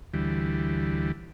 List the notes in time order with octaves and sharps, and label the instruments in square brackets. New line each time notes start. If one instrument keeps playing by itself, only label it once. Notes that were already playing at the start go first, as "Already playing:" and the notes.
[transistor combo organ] D2 E3 G3